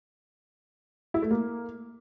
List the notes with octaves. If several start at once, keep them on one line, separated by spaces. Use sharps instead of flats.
E4
A3
A#3